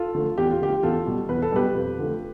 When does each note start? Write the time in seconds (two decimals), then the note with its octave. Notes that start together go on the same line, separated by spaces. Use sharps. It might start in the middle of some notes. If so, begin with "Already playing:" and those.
Already playing: F4 A4
0.15 D3 F3 A3
0.38 E2 G4
0.50 F4
0.61 D3 F3 A3 G4
0.83 E2 F4 A4
1.06 B2 G3
1.29 E2 B4
1.42 A4
1.52 B2 G3 G4 B4
1.75 F2
1.98 D3 F3 A3